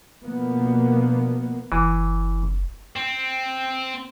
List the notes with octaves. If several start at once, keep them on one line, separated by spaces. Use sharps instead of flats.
B2 D3 F3 A#3 B3
F#1 E3
C4